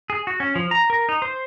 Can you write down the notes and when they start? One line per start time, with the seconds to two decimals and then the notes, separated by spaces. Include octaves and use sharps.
0.10 G#4
0.27 F#4
0.40 C#4
0.56 F3
0.71 A#5
0.90 A#4
1.09 D#4
1.22 C5